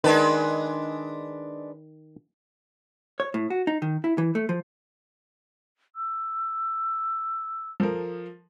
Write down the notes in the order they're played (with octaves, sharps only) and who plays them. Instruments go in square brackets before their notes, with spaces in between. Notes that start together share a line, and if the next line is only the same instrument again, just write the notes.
[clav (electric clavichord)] D#3 A5 [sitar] G#3 D4 B4
[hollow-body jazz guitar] C#5
A2
F#4
D#4
D#3
E4
E3
A3
F3
[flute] E6
[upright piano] F3 A4 A#4